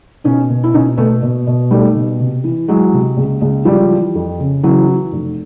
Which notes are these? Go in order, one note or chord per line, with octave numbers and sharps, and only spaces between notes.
B2 C#4 D#4
B2
E4
B2 C#4 D#4
B2 A3 B3
B2
B2
B1 G3 A3
B2
C3
E3
E3 F#3 G#3
C3
C#2
C#2
C#2 F3 G3
E3
F2
C#3
C#3 E3 F#3
E3
F1